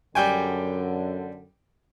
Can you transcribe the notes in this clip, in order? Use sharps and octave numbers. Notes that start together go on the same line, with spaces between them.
F#2 D3 G3 G5 G#5